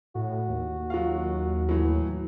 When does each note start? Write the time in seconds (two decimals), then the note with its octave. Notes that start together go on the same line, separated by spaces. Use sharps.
0.15 A2 F#4
0.49 D#2
0.90 F#3 F4 F5
1.69 A2 E3 F#3